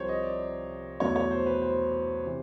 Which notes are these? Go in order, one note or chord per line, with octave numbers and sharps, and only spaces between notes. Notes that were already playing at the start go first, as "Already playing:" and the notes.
Already playing: C2 C3 F3 C5 C#5
D#5
D5
E2 B2 F#3 A3 C#5
C#5
C5
B4
C5
C3 E3